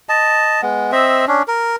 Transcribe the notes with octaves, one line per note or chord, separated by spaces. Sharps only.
D#5 A5
G#3 B3
C4 C5 D#5 E5
C#4 D4
A#4